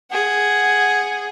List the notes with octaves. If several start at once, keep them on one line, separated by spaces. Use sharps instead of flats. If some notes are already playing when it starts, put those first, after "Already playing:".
G#4 F#5